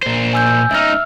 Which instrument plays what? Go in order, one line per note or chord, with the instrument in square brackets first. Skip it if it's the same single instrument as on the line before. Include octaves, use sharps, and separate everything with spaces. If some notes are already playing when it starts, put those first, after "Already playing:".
[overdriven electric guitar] A#2 C5
[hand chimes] G#5 E6 G6
[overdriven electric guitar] C#2 D#4 [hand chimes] E5 E6 F6